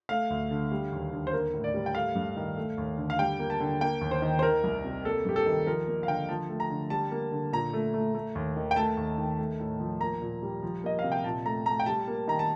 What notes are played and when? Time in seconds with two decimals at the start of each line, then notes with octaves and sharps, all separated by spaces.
0.09 A3 F5
0.30 D2
0.51 D3
0.71 G3
0.92 D#2
1.13 D3
1.27 C5
1.33 A#3 A#4
1.53 A2
1.64 D5
1.74 G3
1.86 G5
1.95 A3 F5
2.15 G2
2.37 D#3
2.57 A3
2.78 D#2
2.98 D3
3.10 F5
3.19 G3 G5
3.39 A#3
3.50 A5
3.60 D3
3.81 A#3 G5
4.01 D#2
4.11 C5
4.22 D#3
4.39 C5
4.42 D#3 A#4
4.64 C2
4.84 C3
5.05 A#3 A4
5.25 G2 G4
5.36 A4
5.46 D#3
5.67 F3 A#4
5.88 A#3
6.03 F5
6.08 D3 G5
6.29 F3 A5
6.49 A3
6.60 A#5
6.70 D3
6.90 G3 A5
7.12 A#3
7.32 D3
7.53 A#2 A#5
7.73 A3
7.94 A3
8.15 A3
8.35 D#2
8.56 D#3
8.71 G5
8.76 A3 A5
8.97 D#2
9.18 D#3
9.39 A3
9.60 A2
9.80 F3
10.01 A#3 A#5
10.22 A#2
10.43 G3
10.63 F3
10.84 A#3 D#5
10.99 F5
11.04 C3
11.12 G5
11.24 A#2 A5
11.46 A3 A#5
11.66 A3 A#5
11.80 G5
11.86 G3 A5
12.08 A#3
12.28 D#3 A#5
12.39 A5